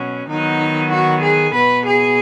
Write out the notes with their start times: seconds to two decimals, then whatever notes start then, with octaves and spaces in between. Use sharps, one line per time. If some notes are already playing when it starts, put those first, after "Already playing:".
Already playing: B2 F#3 C#4
0.29 D#3 F#3 B3 D#4
0.91 F#4
1.22 G#4
1.54 B2 B3 B4
1.85 G#4